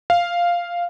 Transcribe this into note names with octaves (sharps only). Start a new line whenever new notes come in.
F5